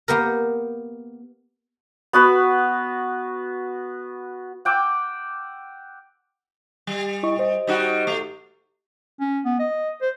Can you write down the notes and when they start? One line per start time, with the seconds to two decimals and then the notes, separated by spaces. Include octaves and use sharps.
0.08 A#3 B3 G4 A#4
2.13 B3 F#4 B4
4.65 F#5 G5 D6 E6
6.87 G3
7.23 E4 D#5 C#6
7.39 C5 D#5
7.67 G3 D#4 F#4
8.07 A3
9.20 C#4
9.45 B3
9.59 D#5
10.01 C5